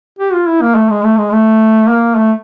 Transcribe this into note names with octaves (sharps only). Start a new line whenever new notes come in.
G4
F4
E4
A#3
A3
G#3
A3
G#3
A3
A#3
A3